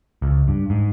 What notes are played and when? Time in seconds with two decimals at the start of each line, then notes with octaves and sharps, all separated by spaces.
0.22 C#2
0.48 G2
0.70 G#2